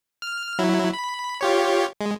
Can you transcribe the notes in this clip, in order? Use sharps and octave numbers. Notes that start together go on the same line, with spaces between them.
F6
F#3 E4
B5
F4 G4 C#5
G#3